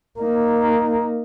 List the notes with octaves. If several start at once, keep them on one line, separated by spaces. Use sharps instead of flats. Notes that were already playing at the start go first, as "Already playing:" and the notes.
A#3 D#4